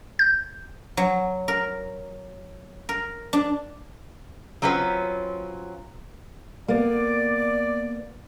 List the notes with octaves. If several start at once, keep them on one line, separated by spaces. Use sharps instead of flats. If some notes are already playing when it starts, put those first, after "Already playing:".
G6
F#3
A#4
A#4
D4
F#3 C4 C#4 F4 B4
A#3 B3 D5